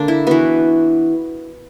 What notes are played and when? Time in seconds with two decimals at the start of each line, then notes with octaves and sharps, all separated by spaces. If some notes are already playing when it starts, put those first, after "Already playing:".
Already playing: D3 A#3 D4
0.08 E4
0.27 E3 B3 F#4